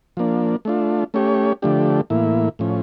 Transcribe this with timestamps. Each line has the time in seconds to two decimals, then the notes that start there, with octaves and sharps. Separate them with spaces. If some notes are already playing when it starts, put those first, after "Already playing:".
0.17 F3 A#3 D4
0.65 A3 D4 F4
1.14 A3 C#4 G4 C#5
1.62 D3 F3 A3 D4 G4
2.10 A2 E3 A#3 E4
2.59 A2 F3 C#4